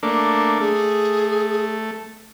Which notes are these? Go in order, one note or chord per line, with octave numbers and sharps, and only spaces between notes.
A3 A#3 D4
A3 G#4